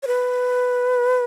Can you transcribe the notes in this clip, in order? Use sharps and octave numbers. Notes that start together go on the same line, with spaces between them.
C#5
B4